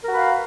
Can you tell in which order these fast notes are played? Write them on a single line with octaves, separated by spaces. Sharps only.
A#4 F#4 B4 F5